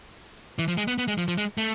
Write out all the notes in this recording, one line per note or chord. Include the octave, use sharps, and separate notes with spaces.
E3
F3
G#3
B3
B3
G#3
F3
F3
G#3
A3